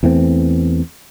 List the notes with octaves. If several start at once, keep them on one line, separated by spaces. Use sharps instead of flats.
E2 E3 A3 C4